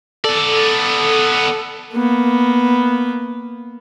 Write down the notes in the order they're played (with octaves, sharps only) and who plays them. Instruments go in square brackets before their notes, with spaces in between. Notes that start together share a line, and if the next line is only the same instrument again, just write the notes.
[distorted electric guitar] B3 D5 [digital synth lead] A4
[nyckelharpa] A#3 B3